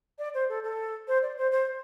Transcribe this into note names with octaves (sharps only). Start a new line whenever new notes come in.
D5
C5
A4
A4
C5
D5
C5
C5